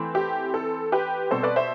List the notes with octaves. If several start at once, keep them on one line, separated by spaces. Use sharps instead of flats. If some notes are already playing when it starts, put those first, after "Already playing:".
Already playing: E3 A3 C4
G4
A4
G4 B4
B2 G3 C4 A4 C5
B4 D5
C5 E5